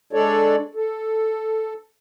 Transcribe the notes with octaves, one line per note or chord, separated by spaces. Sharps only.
G#3 D4 A4 C#5 D5
A4